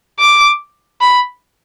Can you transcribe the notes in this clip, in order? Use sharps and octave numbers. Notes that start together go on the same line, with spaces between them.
D6
B5